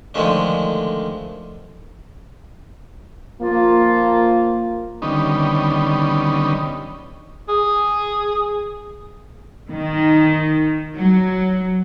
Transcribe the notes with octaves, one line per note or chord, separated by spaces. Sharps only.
D3 D#3 F3 G#3 A3 D4
F3 A#3 F4
D3 D#3 G3 B3 C#4 D#4
G#4
D#3
F#3